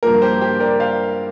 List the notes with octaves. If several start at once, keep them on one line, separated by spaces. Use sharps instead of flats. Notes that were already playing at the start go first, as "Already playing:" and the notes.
G2 F3 A#3 A#4
G4 C5
G4 C5
A#4 D5
C5 F5